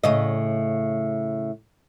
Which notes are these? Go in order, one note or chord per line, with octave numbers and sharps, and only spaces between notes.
A2 C#3 D#5